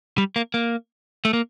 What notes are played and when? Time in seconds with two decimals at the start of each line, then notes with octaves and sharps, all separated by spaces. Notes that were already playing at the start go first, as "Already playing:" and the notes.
0.18 G3
0.36 A#3
0.54 A#3
1.25 A3
1.33 A#3